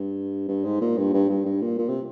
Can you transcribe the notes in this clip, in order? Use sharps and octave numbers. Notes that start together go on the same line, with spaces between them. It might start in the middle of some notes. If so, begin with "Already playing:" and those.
Already playing: G2
G2
G#2
A#2
G2
G2
G2
G2
A#2
A#2
C3